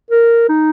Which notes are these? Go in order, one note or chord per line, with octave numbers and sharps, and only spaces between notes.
A#4
D#4